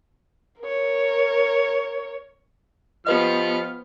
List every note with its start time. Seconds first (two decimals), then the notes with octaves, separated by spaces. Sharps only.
0.62 A#4 C#5
3.07 F3 B3 G4 B4 D#5 F6